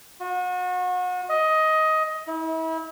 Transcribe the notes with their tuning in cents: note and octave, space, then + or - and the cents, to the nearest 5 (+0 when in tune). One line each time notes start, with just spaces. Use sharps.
F#4 -35
D#5 +15
E4 -35